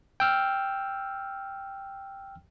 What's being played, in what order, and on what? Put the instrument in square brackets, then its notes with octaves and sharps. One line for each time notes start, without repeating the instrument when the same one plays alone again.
[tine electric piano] G5 E6 F6